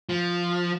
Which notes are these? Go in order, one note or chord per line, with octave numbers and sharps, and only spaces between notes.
F3